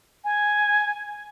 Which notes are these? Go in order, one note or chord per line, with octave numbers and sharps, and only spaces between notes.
G#5